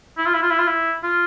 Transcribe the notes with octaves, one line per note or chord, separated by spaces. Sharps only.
E4
F4
E4
F4
E4
F4
E4
F4